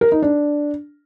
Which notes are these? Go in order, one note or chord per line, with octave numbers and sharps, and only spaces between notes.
A#4
D#4
D4